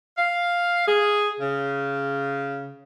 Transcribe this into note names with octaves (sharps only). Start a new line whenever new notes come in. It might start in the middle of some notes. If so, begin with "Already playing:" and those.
F5
G#4
C#3